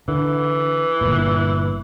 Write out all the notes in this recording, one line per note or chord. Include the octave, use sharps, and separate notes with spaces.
D3 E3
G1 A#2